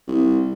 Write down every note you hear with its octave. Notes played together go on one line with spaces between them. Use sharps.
C2